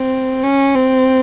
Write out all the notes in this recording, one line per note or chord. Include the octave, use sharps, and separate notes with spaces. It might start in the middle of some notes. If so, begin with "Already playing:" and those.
Already playing: C4
C#4
C4